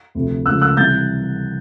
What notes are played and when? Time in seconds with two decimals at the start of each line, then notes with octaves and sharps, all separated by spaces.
0.15 D2 C3 F3
0.46 C#2 C#3 F3 A3 E6 F#6
0.61 E6 F#6
0.77 C3 E3 G3 G6 A6